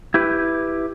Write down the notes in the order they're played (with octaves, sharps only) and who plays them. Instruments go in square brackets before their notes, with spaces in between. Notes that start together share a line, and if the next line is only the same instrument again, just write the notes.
[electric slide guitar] E4 G4 B4